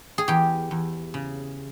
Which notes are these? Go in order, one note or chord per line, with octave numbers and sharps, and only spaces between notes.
G#4
E2 G4
E2
C#3